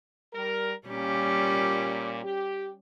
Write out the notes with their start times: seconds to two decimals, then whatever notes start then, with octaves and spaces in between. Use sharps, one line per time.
0.33 G3 A#4
0.88 A#2 G3 C#4 G4
2.23 G4